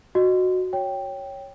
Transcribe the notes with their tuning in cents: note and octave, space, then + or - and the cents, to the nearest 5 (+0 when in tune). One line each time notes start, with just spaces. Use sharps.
F#4 -5 D#5 -20
C#5 +0 G5 +0